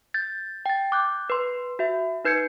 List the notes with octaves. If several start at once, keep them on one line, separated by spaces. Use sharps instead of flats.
G6 A6
G5 A6
D6 F#6 G6
B4 C6
F#4 E5
D#4 B4 G6 G#6 C#7